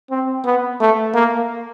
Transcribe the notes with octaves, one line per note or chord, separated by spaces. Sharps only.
C4
B3
A3
A#3